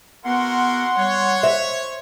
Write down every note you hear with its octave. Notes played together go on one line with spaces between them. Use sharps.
B3 E4 F#4 A#4 F#5 C6
G3 C#5
C5 E5